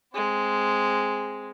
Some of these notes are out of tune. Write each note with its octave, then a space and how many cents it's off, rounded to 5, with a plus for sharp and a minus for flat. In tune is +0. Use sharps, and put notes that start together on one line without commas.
G#3 +0 C4 +0